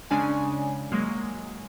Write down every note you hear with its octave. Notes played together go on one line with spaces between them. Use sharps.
C#3 G#3 C#4 D4 D5 G#5
F#3 G#3 A#3